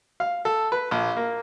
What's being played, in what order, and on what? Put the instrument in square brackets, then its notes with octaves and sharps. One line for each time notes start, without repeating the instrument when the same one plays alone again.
[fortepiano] F5
A4
B4
A#1
A#3